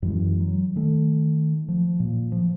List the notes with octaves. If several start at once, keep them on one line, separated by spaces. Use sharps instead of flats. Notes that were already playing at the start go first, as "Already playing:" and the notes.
F#2 E3 G#3
F#3
D#3 A3
F3
A#2
F3